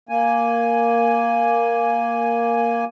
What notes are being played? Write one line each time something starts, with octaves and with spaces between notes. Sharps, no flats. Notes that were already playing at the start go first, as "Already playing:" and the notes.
A#3 G#5